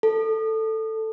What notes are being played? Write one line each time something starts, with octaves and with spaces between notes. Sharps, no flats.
A4